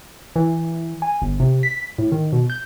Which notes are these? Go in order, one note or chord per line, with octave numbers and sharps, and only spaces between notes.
E3
G#5
G1
C3
B6
A2
D#3
B2
G6